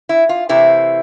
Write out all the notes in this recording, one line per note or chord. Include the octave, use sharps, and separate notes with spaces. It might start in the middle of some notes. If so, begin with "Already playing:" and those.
E4
F4
C3 E3 A3 C4 E4